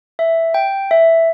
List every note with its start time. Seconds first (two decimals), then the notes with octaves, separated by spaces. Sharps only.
0.19 E5
0.54 G5
0.91 E5